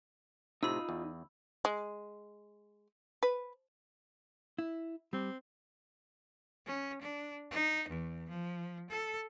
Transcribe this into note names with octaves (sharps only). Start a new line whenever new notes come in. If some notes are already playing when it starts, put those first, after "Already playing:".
A2 C3 D#4 F4 B5 E6
E2
G#3
B4
E4
G3 C4
C#4
D4
D#4
E2
F3
A4